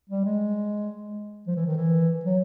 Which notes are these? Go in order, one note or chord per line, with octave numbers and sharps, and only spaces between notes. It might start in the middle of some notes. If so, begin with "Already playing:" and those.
G3
G#3
F3
E3
D#3
E3
F#3